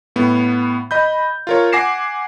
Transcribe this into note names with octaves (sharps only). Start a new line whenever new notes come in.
A2 B3
D#5 B5 G6
F4 A#4 C#5
F#5 G#5 D6 A#6 C7 E7